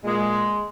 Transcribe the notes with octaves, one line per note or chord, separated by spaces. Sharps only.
A#2 G#3